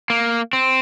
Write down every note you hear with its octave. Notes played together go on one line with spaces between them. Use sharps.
A#3
C4